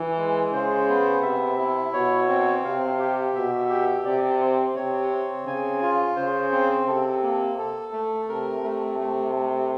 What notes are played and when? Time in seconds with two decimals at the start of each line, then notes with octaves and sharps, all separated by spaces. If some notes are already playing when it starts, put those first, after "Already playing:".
Already playing: E3
0.17 G#3
0.53 C#3 C5
0.88 B3
1.22 C3 E5
1.59 E4
1.93 B2 C#5
2.29 C4
2.64 C3 F5
2.99 G4
3.35 B2 E5
3.69 G4
4.05 C3 D5
4.40 C4
4.76 C3 C#5
5.11 C4
5.46 C#3 G#5
5.82 F4
6.16 C#3 C5
6.52 C4
6.87 C3 A4
7.23 A#3
7.58 A4
7.93 A3
8.28 C3 A#4
8.64 A3
9.00 A3
9.35 A3